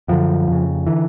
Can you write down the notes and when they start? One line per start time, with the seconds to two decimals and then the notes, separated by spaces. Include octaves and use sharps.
0.08 F#2 D3 F3
0.48 F2 C#3
0.87 D3 E3